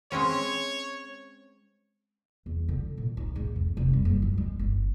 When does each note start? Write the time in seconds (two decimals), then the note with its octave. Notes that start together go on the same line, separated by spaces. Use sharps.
0.12 G#3 C4 C#4 C#5
2.46 E2
2.69 D3
2.97 A#2
3.17 D#4
3.36 G#2
3.56 F2
3.77 F1
3.93 G3
4.05 F#1
4.22 F#3
4.38 G#3
4.59 G1